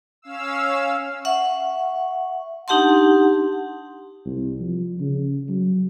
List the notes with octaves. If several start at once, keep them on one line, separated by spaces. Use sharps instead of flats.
C#4 F5 E6
E5 F#5 C#6
D4 D#4 G4 F#5 A5 C6
C2
F3
C#3
F#3